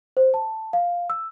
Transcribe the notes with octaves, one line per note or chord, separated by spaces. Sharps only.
C5
A5
F5
E6